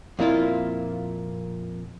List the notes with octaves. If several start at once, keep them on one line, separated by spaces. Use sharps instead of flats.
F2 A#2 A#3 E4 F4